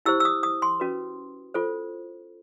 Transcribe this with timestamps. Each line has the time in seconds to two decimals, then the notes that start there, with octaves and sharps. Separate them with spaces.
0.06 E4 G4 C5 E6
0.20 E6
0.25 D#6
0.43 D#6
0.62 C6
0.80 C#4 F#4 B4
1.54 F4 A4 C5